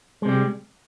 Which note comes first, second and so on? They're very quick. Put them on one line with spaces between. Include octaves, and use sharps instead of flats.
G#3 C3 G3